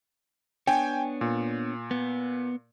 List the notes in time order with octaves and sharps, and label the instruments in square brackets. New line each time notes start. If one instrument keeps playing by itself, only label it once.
[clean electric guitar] B3 D4 C#5 [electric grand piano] G5 G#5
[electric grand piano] A#2
[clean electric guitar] B3